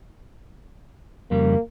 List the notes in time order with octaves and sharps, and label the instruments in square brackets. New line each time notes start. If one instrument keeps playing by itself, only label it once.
[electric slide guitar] F2 C#3 G3 [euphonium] A#3